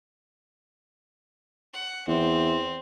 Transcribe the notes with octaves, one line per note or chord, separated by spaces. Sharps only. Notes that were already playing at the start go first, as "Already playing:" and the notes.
F#5
E2 C4